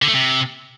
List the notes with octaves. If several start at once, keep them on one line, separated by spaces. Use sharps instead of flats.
D3
A3
C3